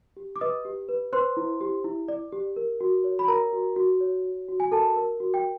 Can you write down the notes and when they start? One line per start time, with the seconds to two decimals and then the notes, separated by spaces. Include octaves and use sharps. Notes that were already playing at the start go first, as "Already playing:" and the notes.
0.17 G4
0.36 D6
0.41 B4 D#5 D#6
0.65 G4
0.89 B4
1.13 B4 C5 C6
1.37 E4
1.61 G4
1.84 E4
2.08 D5
2.32 G4
2.56 A#4
2.81 F#4
3.04 C#5
3.19 B5
3.28 A#4 A#5
3.53 F#4
3.76 F#4
4.00 C#5
4.25 F#4
4.48 F#4
4.60 G#5
4.71 A4 A#4 A5
4.96 A#4
5.20 F#4
5.34 G5